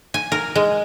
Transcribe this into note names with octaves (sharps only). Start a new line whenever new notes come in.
G#5
A#4
G#3